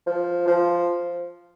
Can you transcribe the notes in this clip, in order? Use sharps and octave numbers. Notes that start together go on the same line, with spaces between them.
F3
F3